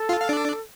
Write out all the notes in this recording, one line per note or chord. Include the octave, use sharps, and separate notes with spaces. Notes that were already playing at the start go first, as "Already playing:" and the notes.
Already playing: A4
F4 F5
F5
D4 D5